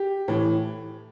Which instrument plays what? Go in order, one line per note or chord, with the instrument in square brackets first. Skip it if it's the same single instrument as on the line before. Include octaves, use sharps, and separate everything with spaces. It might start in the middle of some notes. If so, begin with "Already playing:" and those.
Already playing: [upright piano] G4
A2 E3